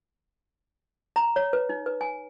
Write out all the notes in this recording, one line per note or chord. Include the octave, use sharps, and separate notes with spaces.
A#5
C#5
B4
D#4
B4
G#5